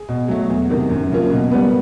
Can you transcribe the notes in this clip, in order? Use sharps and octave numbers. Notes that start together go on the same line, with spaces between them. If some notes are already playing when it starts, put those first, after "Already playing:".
Already playing: G#4
B2
F#3 A3
E2
C3 D#3
F#2
C#3 F3 A#3
B2
G3 B3